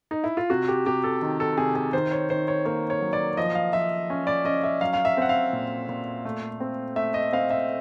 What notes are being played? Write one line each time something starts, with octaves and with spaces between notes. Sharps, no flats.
D#4
E4
F4
C3 F#4
G4
C3 G4
A4
D#3
A4
C3 G#4
G#4
D#3 C5
C#5
D#3 C5
C#5
A#3 C#5
C#5
F#3
D5
F3 D#5
F5
F3 E5
C#4
D5
C#4 D#5
E5
F#3 F5
F5
E5
C4 F#5
F5
A#2
A#2
A3
C4
A3 E5
D#5
C4 F5
E5